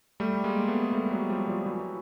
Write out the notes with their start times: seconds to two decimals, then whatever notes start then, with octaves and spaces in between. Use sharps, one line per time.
0.20 G3 A3
0.44 G#3 A#3
0.68 A3 B3
0.93 G3 A3
1.11 F#3 G#3
1.29 F3 G3
1.47 F3 G3
1.66 E3 F#3